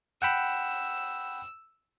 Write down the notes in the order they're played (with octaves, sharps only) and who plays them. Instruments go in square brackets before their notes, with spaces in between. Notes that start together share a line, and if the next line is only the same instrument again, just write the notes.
[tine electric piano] F#5 G5 B5 [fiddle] E6